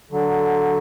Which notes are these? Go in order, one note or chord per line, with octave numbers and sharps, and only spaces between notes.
D3 F#3